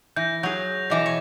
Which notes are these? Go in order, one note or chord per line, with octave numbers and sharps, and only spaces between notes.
E3 G6 A#6
F#3 G#4 G6 F7
B2 E3 A#5 D6 A#6
C#5